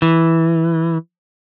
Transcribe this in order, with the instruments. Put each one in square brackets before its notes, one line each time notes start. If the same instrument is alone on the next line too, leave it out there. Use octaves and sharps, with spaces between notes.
[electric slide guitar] E3